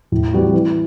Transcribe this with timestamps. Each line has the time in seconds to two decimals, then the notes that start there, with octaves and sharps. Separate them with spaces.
0.12 A2
0.33 E3 G3 C4 F#4
0.54 E3